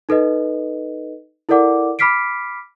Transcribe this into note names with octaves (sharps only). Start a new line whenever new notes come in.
D#4 A4 B4 D#5
E4 A4 A#4 D5 F#5 D6
B5 D6 F6 B6 C7 D7